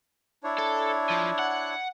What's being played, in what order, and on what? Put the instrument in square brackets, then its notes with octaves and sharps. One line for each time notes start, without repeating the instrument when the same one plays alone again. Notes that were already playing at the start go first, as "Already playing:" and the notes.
[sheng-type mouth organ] D4 E4 C#5
[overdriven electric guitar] A4
F3
F#5